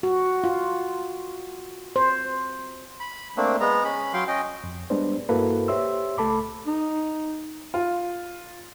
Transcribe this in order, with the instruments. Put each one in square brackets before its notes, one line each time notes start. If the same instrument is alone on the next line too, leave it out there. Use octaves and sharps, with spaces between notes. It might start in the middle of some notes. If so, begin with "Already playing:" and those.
[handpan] F#4
F4
C5
[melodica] B5
A3 A#3 C4 D4
G#3 B3 A#5
C#4 B5
F#3 F5 G5 C6
C#4 D#5 G5
[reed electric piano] F2
G3 G#3 B3 D4 B4 C5
G2 A#3 E4 F#4 A4 B4
G4 C5 C#5 E5 C6 E6
C#2 A3 A4 A5 B5 D6
[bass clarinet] D#4
[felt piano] F4